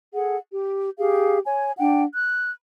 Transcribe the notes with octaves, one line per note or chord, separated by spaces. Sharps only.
G#4 A4 F#5
G4
G4 G#4 F5
C#5 G#5
D4 F#5 G5
F#6